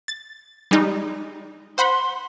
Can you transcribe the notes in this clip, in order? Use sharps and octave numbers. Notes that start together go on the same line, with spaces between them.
A6
G3 G#3 D#4
C5 F#5 B5 C6